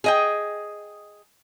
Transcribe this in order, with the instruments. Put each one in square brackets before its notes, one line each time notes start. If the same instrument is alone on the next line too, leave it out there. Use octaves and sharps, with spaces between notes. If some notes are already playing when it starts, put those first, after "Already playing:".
[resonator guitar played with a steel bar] G#4 D#5 G5